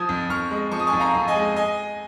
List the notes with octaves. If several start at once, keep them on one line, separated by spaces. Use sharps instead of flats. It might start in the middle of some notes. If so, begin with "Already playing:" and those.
Already playing: F3 D#6 G#6
F2
F2 C#6 F6
G#3
F3 C#6
D#6
G#5 C#6
F2
F5 A#5
F2
D#5 G#5
G#3
D#5 G#5